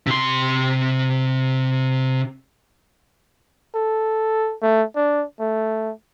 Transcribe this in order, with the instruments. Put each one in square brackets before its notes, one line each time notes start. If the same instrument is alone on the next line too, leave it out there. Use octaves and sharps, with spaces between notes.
[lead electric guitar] C3 C6
[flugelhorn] A4
A3
D4
A3